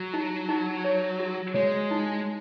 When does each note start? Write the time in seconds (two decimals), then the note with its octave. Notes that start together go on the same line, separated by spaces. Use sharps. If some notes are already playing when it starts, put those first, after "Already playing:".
Already playing: F#3
0.14 D#4
0.49 D#4
0.84 C#5
1.20 F#4
1.54 G#3 C#5
1.91 D#4